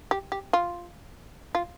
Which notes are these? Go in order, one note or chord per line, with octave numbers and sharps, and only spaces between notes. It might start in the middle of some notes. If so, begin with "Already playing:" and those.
G4
G4
F4
F4